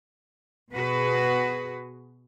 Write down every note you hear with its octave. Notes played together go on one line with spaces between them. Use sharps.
B2 F#4 G#4 B4